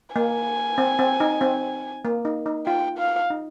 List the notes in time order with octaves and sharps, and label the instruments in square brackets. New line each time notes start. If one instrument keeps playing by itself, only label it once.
[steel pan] A#3 [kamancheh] G#5
[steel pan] C4
C4
D#4
C4
A#3
D#4
D#4
[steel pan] F4 [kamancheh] G5
[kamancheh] F5
[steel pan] D#4